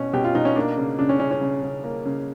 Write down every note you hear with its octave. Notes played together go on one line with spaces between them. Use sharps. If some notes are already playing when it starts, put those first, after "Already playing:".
Already playing: B2 C#4
B2 G4
F4
B2 D#4
C#4
A#3 D4
C#3
C#3 D4
C#4
C#3 C#4
C#4
C#3
C#3
A#3
C#3